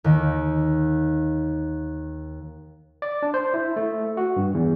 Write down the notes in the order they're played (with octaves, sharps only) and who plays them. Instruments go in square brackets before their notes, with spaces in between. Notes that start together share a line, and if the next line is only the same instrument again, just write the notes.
[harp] D#2 D#3
[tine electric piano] D5
D4
C5
E4
A3
F#4
G2
E2